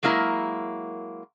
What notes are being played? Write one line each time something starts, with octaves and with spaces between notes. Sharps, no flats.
F#3 G#3 A#3 E4 A#4